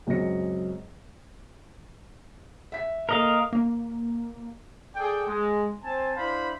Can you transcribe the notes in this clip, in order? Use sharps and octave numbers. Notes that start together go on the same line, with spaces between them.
C#2 F#2 C4 D#5 A#6 C#7
E5 B6
A#3 A4 A#4 D#5 F5
A#3
G#4 A4 D5 G5
G#3
C4 C5 G#5 A5
D4 E4 C5 F5 B5